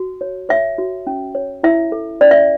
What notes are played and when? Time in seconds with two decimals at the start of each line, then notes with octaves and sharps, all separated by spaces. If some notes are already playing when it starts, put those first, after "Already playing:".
Already playing: F#4
0.21 C#5
0.49 C#5 E5
0.78 F#4
1.07 C#4
1.35 C#5
1.63 E4 E5
1.92 A4
2.21 C#4 D5
2.31 E5